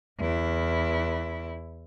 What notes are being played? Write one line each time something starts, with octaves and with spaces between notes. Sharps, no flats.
E2 E4